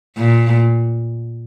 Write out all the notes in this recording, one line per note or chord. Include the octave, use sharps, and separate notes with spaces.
A#2